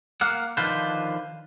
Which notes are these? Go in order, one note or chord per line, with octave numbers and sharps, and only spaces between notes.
A#3 F5 F#5
D3 D#3 F3 F4 B4 C5